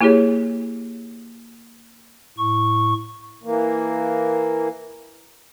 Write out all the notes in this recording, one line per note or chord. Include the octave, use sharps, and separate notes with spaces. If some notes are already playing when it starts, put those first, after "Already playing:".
A#3 E4 G4 G#4 C#5
A2 C#6
E3 A#3